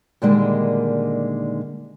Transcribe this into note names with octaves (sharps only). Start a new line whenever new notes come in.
A#2 D3 D#3 G3 G#3 A#3